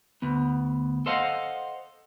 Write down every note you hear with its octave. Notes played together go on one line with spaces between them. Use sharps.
D2 B3
A4 C5 D#5 F5 F#5